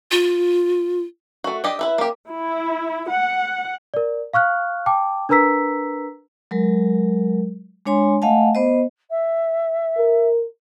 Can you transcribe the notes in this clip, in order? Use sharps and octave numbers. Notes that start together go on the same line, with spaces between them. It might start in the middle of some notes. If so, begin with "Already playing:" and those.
F4
A3 F#4
D4 G4 D#5
E4 B4 E5
A#3 G4
E4
F#5
A#4 D5
F5 C#6 F6 F#6
G5 A5 D6
D4 A#4 B4 A#5 E6 B6
F#3 G#3 A#4
G#3 D4 C#5 G#5 C6
A3 D#5 F5 F#5 G#5 A5
B3 C5 D#5
E5
A#4